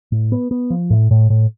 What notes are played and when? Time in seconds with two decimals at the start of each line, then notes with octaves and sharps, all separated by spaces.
0.12 A2
0.32 B3
0.51 B3
0.70 F3
0.90 A2
1.11 A2
1.30 A2